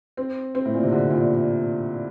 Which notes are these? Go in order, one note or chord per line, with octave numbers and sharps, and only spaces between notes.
C4
C4
A2
A#2
C3
D3
A#2